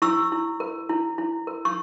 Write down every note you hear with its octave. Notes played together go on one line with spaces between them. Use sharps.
E4 C#6 E6
E4
A#4
E4
E4
A#4
C#6